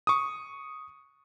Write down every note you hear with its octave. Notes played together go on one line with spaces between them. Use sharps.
C#6 D#6